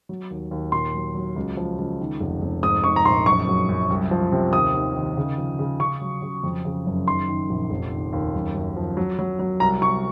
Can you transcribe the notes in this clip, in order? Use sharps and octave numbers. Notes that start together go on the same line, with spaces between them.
F#3
D#2
D#2
A#2 C6
F#3
F#3
C#2
F3
C#2
D#3
F1
F1
G#2 D#6
G#2 C#6
A#5
A#1 C6
F#1 C#6
F#3
F#2
C2
F3
C3
D#2 D#6
D#3
D#3
C#3
F3
C#3
C#3 C#6
F#3
C#3
F2
C#3
F#1
D#3 C6
D#3
A#1
F1
D#3
D#2
F#1
F#2
F3
F#3
F#3
F#3
C2 A#5
C2 C#6